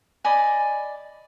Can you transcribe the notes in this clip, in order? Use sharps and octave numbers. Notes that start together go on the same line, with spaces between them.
D5 D#5 G#5 B5